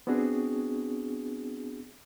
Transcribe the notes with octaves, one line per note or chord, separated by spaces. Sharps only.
B3 C4 D4 F#4 G#4